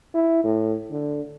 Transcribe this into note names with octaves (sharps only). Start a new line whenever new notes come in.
E4
A2
D3